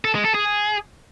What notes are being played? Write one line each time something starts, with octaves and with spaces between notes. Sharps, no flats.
A4
G#3
A4
G#4